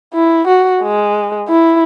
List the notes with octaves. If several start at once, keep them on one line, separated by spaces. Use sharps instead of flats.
E4
F#4
G#3
E4